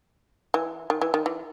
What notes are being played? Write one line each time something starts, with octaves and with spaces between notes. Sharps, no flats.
E3
D#3
E3
D#3
E3